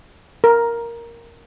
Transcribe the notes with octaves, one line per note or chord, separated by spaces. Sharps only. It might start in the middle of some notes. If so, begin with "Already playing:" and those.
A#4